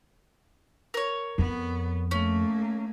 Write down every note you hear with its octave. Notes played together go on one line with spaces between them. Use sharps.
A#4 C#5
F2 B3
A3 A#3 C#4